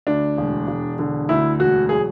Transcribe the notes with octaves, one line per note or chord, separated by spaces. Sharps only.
D2 D4
E1
E1
D3
D2 E4
E1 F#4
F#3 G#4